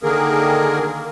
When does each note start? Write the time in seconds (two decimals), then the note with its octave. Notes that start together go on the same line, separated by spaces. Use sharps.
0.03 D3 D#3 A#3 G#4 A#4